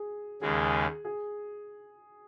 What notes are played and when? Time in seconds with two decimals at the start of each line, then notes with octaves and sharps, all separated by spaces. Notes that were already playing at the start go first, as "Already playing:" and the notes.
Already playing: G#4
0.42 D#2 C#3 G#3 G#4
1.05 G#4